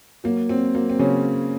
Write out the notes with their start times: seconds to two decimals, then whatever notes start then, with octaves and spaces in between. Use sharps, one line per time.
0.24 F#3 A#3
0.49 F#3 C4
0.75 F#3 A#3
0.90 C4
0.99 C#3 F#3 C#4